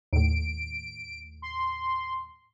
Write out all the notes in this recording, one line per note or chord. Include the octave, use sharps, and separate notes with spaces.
D#2 A2 D7
C6